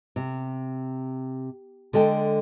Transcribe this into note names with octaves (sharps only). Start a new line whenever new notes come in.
C3
D3 G#3 A4 G5